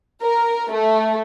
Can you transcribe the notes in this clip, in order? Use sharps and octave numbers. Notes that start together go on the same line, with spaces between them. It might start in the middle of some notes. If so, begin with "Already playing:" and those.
A#4
A3